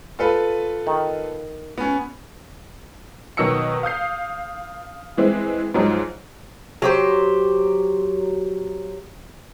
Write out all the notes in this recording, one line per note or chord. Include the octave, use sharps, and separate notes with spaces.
F4 A4 B4
D#3
B3 C#4
B2 D#3 F#3 D#5 E6 C#7
F5 D#6 G6 C7
E3 G#3 C4 E4
G#2 F3 F#3 G#3 D#4
F#3 G4 C5